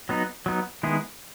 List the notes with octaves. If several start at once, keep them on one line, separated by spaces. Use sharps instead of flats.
F#3 B3 D#4
F#3 B3 D#4
D#3 G#3 B3 E4 G#4